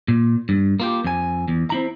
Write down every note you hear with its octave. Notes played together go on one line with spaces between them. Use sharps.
A#2
G2
A#3 F4 G4
F2 G#5
E2
C4 E4 A#5